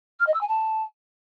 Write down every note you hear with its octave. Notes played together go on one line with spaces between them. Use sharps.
F6
D#5
E6
G#5
A5